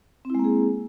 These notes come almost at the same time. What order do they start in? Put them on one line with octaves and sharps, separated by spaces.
C4 E4 G#3 A#3 G#4